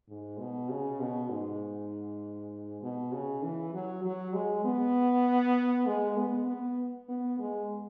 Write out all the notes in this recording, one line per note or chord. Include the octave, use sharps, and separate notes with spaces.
G#2
B2
C#3
B2
G#2
B2
C#3
E3
F#3
F#3
G#3
B3
G#3
B3
B3
B3
G#3